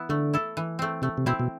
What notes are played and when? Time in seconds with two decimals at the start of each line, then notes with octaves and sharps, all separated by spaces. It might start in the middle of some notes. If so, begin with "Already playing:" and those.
Already playing: E3 B3 E4
0.09 D3 A3
0.34 E4 A4
0.57 E3
0.79 A3 C4
1.02 C3 A3
1.18 C3
1.26 B2 C4 E4
1.40 B2